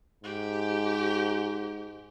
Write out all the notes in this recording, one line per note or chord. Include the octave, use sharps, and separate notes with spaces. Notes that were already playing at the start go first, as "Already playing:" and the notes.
G#2 G4